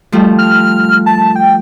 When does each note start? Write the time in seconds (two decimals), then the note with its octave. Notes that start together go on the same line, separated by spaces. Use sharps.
0.12 F3 G3 A3
0.38 F6
1.06 A5
1.36 G5